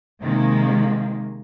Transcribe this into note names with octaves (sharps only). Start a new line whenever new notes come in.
C3 D#3 G#3 A#3